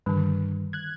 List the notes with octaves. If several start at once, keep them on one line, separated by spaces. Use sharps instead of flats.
G2 D3 D#3
F#6 G#6